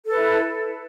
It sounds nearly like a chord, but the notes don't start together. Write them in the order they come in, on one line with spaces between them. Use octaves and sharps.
A4 B4 E4